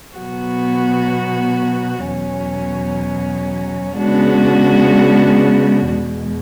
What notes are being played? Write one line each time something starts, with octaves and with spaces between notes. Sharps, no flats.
B2 F#3 B3 F#4
E2 B2 F#3 C#4
C#3 G#3 B3 D4 F#4
E2 B2 G#3